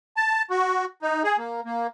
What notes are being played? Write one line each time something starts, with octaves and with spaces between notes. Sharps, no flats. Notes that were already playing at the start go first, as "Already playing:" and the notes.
A5
F#4
D#4
G#4
A#3
A#3